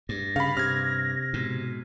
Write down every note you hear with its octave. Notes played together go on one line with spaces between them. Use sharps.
G2 A#6
C#3 F5 B5
C3 F6 G#6
G#2 B2